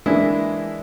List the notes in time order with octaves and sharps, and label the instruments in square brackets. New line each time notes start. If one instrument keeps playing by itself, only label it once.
[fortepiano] E3 G#3 A#3 D4 E4